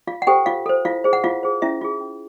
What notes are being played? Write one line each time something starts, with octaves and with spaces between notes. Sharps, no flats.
F4 F5
F#5
G4 A4 C5 G5
F4 F5
A4 C5
E4 F4 F5
G#4 C5
F#5
E4 F4 F5
G#4 C5
C#4 E4 E5
F4 G#4
C#4